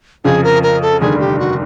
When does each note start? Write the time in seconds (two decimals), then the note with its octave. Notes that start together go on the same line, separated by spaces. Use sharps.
0.24 F2 C#3 F3 G#4
0.44 A#4
0.63 A#4
0.82 A4
1.01 F1 D#2 D3 G3 G#4
1.20 G4
1.39 F#4